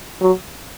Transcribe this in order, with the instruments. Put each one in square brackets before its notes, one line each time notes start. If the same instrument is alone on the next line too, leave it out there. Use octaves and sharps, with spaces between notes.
[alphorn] F#3